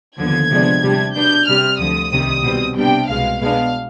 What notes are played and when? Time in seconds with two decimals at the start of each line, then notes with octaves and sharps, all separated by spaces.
0.18 D#2 D3 F3 B3 G#6
0.50 C3 F3 G#3 B3 D4
0.82 C3 G3 D4
1.14 B2 B3 D4 G6
1.47 C3 G3 C4 F6
1.79 D2 D3 F3 D#6
2.12 C2 C3 D#3 G3 C4
2.44 B2 G3 C4
2.76 C3 G3 B3 D4 G5
3.08 C2 B2 G#3 F5
3.41 B2 G#3 B3 D4 F5